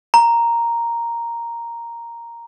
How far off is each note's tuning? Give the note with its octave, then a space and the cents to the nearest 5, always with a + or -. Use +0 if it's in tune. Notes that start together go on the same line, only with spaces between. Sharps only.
A#5 +0